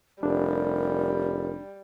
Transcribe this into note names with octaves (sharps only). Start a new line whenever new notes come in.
F1 G3 D4 A#4